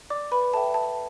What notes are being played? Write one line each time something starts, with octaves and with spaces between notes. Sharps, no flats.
D5 D6
B4 B5
A4 E5 G5 A5
A5